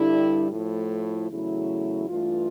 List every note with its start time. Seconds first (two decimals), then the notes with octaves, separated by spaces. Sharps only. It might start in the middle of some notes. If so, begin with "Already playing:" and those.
Already playing: G2 D3 G3 E4
0.51 A2 F3 A3 E4
1.29 E2 C#3 F#3 A3 E4
2.07 G2 E3 A3 F4